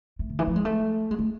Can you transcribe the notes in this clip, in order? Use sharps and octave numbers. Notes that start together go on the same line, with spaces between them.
A3
D3
E3
F3
G#3
A3
G#3
A3